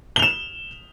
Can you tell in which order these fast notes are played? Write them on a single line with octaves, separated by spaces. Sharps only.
G7 F7 E7